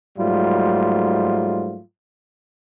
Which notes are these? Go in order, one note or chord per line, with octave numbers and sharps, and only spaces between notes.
G#2 F#3 G3 A3 F4